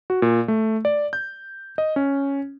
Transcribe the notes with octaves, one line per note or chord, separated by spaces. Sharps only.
F#4
A#2
A3
D5
G6
D#5
C#4